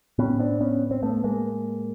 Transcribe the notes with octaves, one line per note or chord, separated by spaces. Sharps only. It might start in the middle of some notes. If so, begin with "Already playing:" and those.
A2 B3 C#4
C4 D4
B3 C#4
C4
A3 B3
G#3 A#3